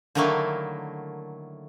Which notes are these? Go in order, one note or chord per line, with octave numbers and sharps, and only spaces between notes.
D3 D#3 F#3 A3 A#3 E4